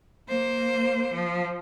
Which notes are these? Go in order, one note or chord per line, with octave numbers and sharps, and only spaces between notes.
A#3 C5
F3